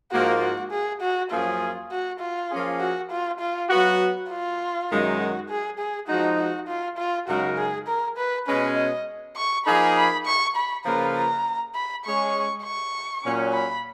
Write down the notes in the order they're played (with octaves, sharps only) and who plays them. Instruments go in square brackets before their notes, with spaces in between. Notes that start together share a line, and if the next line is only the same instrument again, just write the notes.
[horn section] G#2 F3 A#3 F4 [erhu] F#4
[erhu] F#4
G#4
F#4
[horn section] F#2 F3 A#3 C#4 G#4 [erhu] F4
[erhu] F#4
F4
[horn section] F3 A#3 C#4 G#4
[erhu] F#4
F4
F4
[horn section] F#3 B3 F#4
[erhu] F4
[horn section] F#2 D#3 G#3 D#4
[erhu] F#4
G#4
G#4
[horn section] F3 G#3 D#4 [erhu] F#4
[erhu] F#4
F4
F4
[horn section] F#2 C#3 G#3 D#4 A#4 [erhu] F#4
[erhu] G#4
A#4
B4
[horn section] B2 G#3 C#4 [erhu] B4
[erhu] D#5
C#6
[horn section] F3 A#3 D#4 G#4 [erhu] B5
[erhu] B5
C#6
B5
[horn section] C#3 F3 A#3 F4 B4 [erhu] A#5
[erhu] A#5
B5
[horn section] G#3 C#4 G#4 C#5 [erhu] C#6
[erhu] C#6
[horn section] A#2 F#3 C#4
[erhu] B5